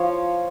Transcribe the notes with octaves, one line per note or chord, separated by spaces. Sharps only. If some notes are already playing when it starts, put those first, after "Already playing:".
Already playing: F3 C#5